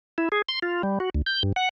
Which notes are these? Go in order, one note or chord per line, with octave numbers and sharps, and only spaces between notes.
E4
G#4
C6
F4
G3
F#4
D2
G6
G2
F#5